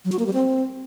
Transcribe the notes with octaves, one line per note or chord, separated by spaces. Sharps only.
F#3
F#4
A#3
G3
C4